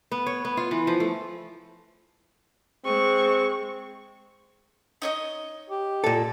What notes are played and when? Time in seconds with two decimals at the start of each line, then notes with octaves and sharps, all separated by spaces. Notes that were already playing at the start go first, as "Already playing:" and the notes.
0.12 B3
0.26 C#5
0.45 B3
0.57 F4
0.71 E3
0.87 F3
1.00 A3
2.85 G#3 C4 C#6
5.02 D#4 C#5 D#5
5.70 G4
6.04 A#2 A4